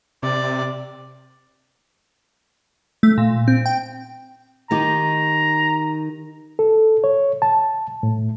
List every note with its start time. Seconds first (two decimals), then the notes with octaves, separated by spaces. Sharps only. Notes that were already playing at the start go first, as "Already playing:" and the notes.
0.23 C3 D5
3.03 A3
3.18 A#2
3.48 C4
3.66 G5
4.71 D#3 D#4 G4 A#5
6.59 A4
7.04 C#5
7.42 A5
8.03 A2